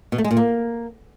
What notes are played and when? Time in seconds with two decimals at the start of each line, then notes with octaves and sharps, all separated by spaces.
0.12 B2
0.18 A3
0.24 G#3
0.31 A#2
0.37 A#3